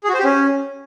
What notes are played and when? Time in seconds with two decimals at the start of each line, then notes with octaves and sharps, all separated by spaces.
0.04 G#4
0.09 F#4
0.14 C5
0.19 G4
0.24 C#4